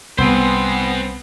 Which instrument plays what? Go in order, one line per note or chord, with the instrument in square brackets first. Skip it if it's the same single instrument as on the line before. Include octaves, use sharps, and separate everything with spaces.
[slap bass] C2 [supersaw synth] B3 [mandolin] C4 [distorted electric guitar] C5 G#5